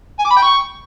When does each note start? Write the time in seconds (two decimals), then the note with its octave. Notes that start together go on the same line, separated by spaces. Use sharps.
0.19 G#5
0.25 D6
0.31 B5
0.36 G5
0.42 C#6